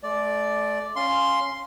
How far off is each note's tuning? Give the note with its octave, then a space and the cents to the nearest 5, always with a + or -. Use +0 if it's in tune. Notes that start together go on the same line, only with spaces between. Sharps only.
A3 -40 D5 +0
C#4 +0 F5 +0 C6 +0